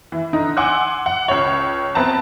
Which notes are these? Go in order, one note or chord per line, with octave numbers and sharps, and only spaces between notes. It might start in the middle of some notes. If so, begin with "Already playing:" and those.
E3
D3 D#4
F#5 G#5 C6 D6 E6 F#6
F#5
C#2 C#5
B3 C4 B4 A5 A#5